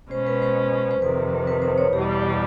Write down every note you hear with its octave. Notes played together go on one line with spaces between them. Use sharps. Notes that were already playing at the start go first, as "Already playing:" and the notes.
B2 G#3 C#4 C5
B4
C5
C5
F2 C3 D#3 B4
B4
C5
C#5
E2 B2 G3 G4